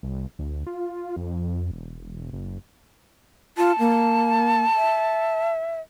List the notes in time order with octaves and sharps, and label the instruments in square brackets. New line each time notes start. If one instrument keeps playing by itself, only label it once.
[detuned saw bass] C2
D2
F4
F2
E1
F#1
[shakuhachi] F4 [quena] A5
[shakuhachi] A#3
E5